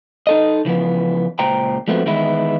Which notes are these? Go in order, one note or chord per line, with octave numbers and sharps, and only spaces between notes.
D#4 A4 D#5
C#3 E3 F3 B3
C#2 A#2 C5 G5 A#5
F3 G#3 A3 B3 C4 F#4
D#3 E3 G#3 B3 E4